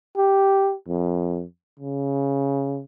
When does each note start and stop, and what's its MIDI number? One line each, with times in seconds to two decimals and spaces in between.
0.17 0.74 67
0.87 1.45 41
1.79 2.83 49